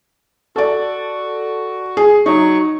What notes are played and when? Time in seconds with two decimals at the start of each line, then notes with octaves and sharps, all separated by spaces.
0.56 F#4 A4 D5
1.97 G#4
2.26 F#3 D#4 C#6